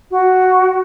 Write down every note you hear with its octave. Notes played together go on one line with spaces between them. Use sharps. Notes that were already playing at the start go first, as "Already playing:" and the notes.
F#4